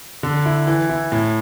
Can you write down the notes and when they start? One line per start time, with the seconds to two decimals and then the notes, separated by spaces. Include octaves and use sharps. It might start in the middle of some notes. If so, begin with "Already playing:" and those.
0.23 D3
0.45 E4
0.67 E3
0.89 E4
1.12 A2